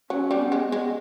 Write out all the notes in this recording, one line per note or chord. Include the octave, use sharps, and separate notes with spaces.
F#3 C#4
G3
B3
G#3
B3
G#3